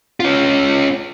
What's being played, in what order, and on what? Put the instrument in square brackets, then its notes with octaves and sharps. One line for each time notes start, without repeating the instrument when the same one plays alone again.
[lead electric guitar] C#4 F4